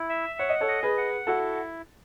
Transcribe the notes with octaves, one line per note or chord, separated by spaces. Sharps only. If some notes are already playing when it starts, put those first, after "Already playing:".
Already playing: E4
E5
C#5 F#5
D#5
A4 C#5
D#5
G#4 B4
F#5
E4 F#4 A4